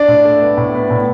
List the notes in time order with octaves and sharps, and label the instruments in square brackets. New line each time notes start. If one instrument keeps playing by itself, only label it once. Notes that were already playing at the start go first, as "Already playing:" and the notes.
Already playing: [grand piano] D4 D5
A2
A3
B3
A2
B3
A2